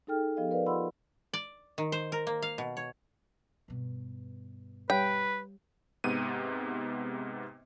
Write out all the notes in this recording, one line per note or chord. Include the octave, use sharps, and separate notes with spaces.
D#4 G#4 A4 G5 F6
F3 B3 G4 A4 D#5 F5
A#4 B4 D5 F5
F4 D#5 F#5 B5 C6 E6
D5
D#3
C5
A#4
A#3
F5
B2
C#5
G2 B2
G3 G4 B4 C#5 G5
G#2 C3 B3 D#7